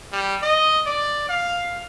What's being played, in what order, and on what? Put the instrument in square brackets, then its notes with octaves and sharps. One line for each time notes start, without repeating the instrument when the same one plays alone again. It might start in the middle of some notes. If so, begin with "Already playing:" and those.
[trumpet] G3
D#5
D5
F5